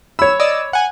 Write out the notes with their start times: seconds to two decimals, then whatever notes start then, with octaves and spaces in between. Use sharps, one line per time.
0.19 C#5 B5 E6
0.40 D5 D#5 E6
0.73 F#5 G#5